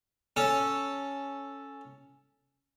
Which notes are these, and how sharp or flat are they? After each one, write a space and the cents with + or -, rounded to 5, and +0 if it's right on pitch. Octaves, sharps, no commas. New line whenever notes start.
C#4 +0 A4 +0